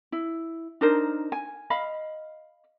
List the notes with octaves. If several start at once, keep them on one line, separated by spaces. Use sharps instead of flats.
E4
D4 D#4 A#4 C5
G#5
D#5 F5 B5